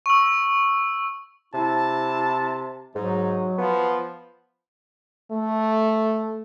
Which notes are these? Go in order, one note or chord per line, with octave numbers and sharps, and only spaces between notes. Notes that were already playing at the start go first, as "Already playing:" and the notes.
C#6 E6
C3 E4 A5
G#2 F#3 D#4
F3 B3
A3